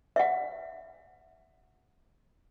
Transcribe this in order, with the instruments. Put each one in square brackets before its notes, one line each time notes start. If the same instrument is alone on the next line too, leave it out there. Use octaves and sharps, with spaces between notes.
[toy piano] E5 F#5